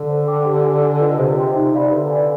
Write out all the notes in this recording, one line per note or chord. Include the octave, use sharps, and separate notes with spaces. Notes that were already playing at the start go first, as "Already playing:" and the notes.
Already playing: D3
C5
G5 D6
G4
D5 G#5
D4
F4 B4 D#5
C3 C5
D#5 G5 C6
D#4
G4 D5 F5 B5
D3 B4
D5 G#5